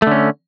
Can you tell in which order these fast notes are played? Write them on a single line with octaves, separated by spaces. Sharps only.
A3 D3 C#4